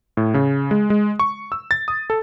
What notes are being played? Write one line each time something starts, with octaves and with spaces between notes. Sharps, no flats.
A2
C#3
G#3
G#3
C#6
E6
A6
D#6
A4